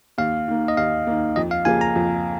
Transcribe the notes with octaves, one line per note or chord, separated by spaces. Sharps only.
D#2 F5
D#3 A#3
D#5
D#2 F5
D#3 A#3
F2 D#5
F5
C#3 F3 A#3 F4 G#5
A#5
F2